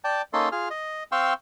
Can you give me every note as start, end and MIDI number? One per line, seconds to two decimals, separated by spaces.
0.04 0.22 74
0.04 0.22 79
0.04 0.22 81
0.33 0.49 58
0.33 0.49 61
0.33 0.49 63
0.33 0.49 69
0.33 0.49 84
0.52 0.69 65
0.52 0.69 68
0.52 0.69 89
0.70 1.03 75
1.12 1.33 60
1.12 1.33 77
1.12 1.33 79
1.12 1.33 84
1.12 1.33 85
1.12 1.33 88